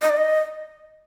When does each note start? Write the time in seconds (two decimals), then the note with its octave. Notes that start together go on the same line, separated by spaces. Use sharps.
0.02 D#5
0.10 D5
0.17 D#5